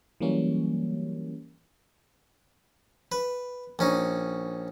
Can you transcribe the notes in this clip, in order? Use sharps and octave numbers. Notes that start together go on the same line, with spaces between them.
E3 F#3 G3 A#3 C#4
B4
A#1 C#4 D#4